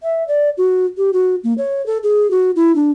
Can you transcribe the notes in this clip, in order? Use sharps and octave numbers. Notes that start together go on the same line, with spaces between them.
E5
D5
F#4
G4
F#4
A#3
C#5
A4
G#4
F#4
E4
D4